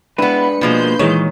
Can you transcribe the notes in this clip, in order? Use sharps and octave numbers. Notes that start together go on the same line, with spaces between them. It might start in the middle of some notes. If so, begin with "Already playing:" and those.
G#3 B3 D4 E4 B4 B5 C#7
B2 F3 G#3 A#3 C6 G6
A#2 D#3 E3 G#3 C#5